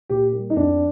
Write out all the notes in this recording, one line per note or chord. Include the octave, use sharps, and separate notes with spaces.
A#2 G4
G3 A#3
D#4
F2 D4